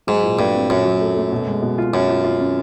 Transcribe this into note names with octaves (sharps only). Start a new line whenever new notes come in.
G#2 F#3
A#2
G2 A3
C4
F#2 A#2
F#3
A3
A3
B2
G#3
B2
F4
F#2 F4
F4
F4
C#4